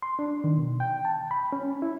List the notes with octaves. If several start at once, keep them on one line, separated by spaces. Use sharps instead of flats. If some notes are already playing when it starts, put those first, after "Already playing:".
C6
D4
D#3
B2
G5
A5
B5
C#4
E4